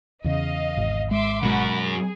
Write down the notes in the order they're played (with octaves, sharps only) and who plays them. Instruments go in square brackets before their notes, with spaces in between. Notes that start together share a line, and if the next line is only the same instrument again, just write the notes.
[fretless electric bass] E2 C#3 [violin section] D#5 F5
[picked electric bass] G#1
[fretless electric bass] G#3 [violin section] E5 C6 D6
[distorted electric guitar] F#2 F#4 [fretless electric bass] B2 G#3 [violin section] F#5 B5
[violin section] G#4